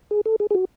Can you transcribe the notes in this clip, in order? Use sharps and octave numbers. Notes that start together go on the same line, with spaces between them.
G#4
A4
G#4
G#4
F#4